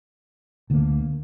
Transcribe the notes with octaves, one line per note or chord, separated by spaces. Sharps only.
D2 D3 G3 A#3